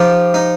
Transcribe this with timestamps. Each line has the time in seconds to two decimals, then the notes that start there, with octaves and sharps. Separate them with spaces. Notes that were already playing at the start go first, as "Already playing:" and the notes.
Already playing: F3 D#4 G4
0.34 D#4